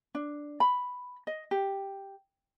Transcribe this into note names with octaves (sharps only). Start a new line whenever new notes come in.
D4
B5
D#5
G4